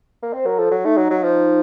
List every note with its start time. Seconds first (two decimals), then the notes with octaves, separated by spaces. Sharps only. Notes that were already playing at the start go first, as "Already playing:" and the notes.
0.22 A#3
0.33 C4 C5
0.46 F#3 A#4
0.59 F3 A4
0.71 F#3
0.84 A3 D#4
0.97 F#3
1.10 F#3
1.23 F3